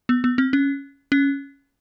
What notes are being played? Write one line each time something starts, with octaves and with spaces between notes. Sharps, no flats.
B3
B3
C4
C#4
C#4